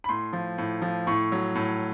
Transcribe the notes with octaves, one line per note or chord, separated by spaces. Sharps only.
B5
A2 C6
F3
A2
F3
A2 C#6
F#3
A2